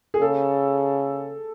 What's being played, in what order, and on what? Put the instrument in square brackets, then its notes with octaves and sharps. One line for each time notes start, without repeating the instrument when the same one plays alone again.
[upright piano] G#4
[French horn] C#3 [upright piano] A4